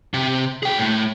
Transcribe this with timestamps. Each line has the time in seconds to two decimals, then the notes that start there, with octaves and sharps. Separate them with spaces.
0.14 C3
0.63 G#4 G5
0.78 A2 A3